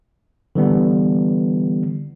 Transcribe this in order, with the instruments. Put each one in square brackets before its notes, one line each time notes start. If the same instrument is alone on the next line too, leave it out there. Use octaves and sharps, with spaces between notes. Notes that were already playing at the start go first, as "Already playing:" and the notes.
[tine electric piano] D3 E3 G3 B3